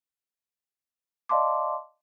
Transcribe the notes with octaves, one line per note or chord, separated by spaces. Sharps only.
D5 D#5 F5 A5 C6 D6